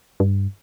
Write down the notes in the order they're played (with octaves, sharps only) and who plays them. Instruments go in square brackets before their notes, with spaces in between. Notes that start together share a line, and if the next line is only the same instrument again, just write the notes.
[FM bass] G2